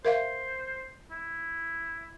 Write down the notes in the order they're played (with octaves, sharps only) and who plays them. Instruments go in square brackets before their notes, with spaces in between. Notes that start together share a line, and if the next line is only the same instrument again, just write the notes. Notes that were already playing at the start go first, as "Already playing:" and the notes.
[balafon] A#4 E5 F5 [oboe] C5
[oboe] E4